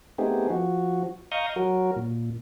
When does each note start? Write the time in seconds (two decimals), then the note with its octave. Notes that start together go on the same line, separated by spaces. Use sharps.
0.18 A3 B3 C4 D#4 G4 G#4
0.50 F3 F#4
1.32 D#5 F5 A#5 C#6 D#6 G6
1.56 F#3 F#4 A#4
1.96 A#2